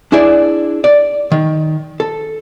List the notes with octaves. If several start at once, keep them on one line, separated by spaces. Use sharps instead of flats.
D4 E4 G#4 D5
D5
D#3
A4